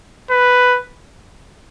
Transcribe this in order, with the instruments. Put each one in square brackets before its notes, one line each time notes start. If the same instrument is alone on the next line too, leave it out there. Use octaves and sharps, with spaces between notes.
[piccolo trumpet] B4